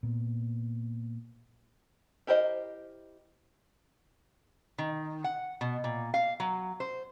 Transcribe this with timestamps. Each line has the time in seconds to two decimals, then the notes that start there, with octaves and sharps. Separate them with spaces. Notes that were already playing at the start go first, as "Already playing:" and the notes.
0.03 A#2 B3
2.27 E4 G4 A#4 C5 D#5
4.78 D#3
5.24 F#5
5.61 B2
5.84 A#2
6.14 F5
6.40 F#3
6.80 C5